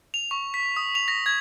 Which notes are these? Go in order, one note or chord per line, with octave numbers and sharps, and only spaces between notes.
F7
C#6
B6
D#6
F7
A#6
G#6